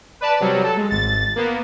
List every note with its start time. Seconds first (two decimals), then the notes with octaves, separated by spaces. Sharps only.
0.21 B4 D5 A5
0.40 C3 F#3 G3
0.63 A4
0.77 G#3
0.90 G#1 A6
1.36 A#3 B3